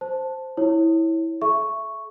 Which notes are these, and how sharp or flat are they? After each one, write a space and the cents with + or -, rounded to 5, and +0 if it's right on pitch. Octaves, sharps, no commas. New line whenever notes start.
C5 +0 A5 +0
E4 -10 C#5 -15
A4 -45 E5 +10 C#6 +0